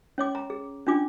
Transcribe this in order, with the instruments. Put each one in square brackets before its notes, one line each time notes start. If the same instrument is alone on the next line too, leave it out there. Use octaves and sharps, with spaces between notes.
[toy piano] C#4 C#5 D6
A#5
G#4
C#4 D4 F4 D6